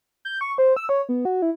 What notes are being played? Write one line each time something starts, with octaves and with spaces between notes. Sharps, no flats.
G6
C#6
C5
E6
C#5
B3
F#4
E4